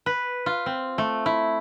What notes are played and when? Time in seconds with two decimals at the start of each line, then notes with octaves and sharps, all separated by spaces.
0.06 B4
0.46 F4
0.66 C4
0.98 A3
1.26 E4